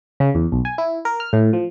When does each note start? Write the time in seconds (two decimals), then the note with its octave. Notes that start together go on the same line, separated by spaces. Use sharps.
0.20 C#3
0.35 E2
0.52 B1
0.65 G#5
0.78 E4
1.05 A#4
1.20 F6
1.33 A2
1.53 F3